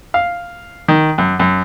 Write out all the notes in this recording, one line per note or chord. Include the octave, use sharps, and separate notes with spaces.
F5
D#3
F#2
F#2